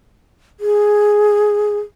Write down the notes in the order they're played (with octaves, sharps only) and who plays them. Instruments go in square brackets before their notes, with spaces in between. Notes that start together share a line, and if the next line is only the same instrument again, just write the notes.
[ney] G#4